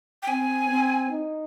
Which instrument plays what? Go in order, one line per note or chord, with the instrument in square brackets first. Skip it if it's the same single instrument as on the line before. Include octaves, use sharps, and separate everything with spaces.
[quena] G5
[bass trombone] C4 [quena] G#5
[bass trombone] C4
D#4